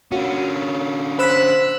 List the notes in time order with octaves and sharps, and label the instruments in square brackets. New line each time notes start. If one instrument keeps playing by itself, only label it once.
[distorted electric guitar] D3 C#4 [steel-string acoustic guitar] A#3 F4 F#4
[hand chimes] C5 B6 [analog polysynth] B5 E6 F#6